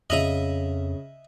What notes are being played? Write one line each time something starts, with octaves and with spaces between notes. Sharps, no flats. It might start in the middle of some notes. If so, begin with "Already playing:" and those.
F2 C#3 D#5 E5 D#6 F7 F#7